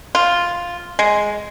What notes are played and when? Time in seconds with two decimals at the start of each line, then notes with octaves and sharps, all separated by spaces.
0.15 F4
0.99 G#3